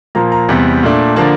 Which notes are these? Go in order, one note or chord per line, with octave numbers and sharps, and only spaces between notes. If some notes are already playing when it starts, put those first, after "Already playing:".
A#2 F3 A#3 A#5
A#5
E2 C3 G3
A#2 A3 D4
D3 F3 A#3 D4 A5